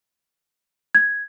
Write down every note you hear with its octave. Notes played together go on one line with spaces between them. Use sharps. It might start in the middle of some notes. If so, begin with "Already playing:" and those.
G#6